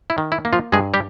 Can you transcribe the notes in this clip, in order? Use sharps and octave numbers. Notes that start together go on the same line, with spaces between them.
E4
D#3
E4
A#3
F3 F4
G2 G#3 G#4
G3 G4